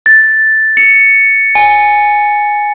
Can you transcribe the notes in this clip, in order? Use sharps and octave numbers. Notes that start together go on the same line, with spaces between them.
A6
C#7
G#5